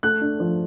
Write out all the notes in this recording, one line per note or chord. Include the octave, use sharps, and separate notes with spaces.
A3 F#6
D4
F3